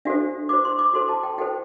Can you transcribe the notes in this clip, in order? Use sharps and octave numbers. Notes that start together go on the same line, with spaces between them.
D4 F#4 A4 C5 E5
F#4 C5 D6
C6
D6
F#4 A4 C5 C6
A5
G5
F#4 A4 C5 G5